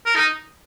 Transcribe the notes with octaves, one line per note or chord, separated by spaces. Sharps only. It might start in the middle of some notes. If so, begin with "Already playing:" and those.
A#4
D#4